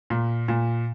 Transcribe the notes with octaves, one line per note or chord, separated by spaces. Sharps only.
A#2
A#2